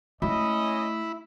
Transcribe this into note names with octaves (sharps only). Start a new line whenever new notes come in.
A3 C#4 E4 D#5 B5